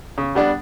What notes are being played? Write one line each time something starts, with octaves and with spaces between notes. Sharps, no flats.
C#3
G3 B3 D4